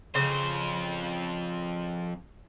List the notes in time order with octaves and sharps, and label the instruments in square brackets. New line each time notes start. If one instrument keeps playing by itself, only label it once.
[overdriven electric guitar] F2 C5 [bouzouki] C#3